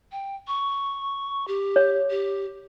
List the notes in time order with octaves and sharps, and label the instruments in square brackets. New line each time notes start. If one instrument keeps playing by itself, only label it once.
[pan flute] G5
C#6
G4
[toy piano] C#5
[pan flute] G4